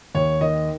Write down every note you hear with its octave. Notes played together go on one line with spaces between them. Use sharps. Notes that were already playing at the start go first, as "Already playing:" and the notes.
D#2 C#5
D#3 D#5